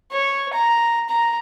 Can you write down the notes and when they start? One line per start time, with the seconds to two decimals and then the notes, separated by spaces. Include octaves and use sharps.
0.12 C#5
0.54 A#5
1.09 A#5